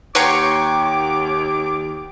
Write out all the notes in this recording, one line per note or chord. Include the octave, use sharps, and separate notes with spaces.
D#2 C#5 F#5 G5 A#5 C6 D6